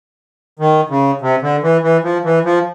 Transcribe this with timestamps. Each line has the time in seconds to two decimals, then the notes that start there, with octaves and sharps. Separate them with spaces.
0.59 D#3
0.90 C#3
1.21 C3
1.42 D3
1.63 E3
1.83 E3
2.04 F3
2.25 E3
2.44 F3